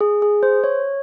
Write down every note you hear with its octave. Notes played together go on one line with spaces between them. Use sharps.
G#4
G#4
C5
C#5